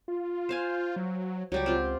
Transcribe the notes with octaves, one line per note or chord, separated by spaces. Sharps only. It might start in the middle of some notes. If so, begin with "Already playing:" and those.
F4
C5 F5 G#5
F#3
C#2 F#3 G3 G4
C4 F4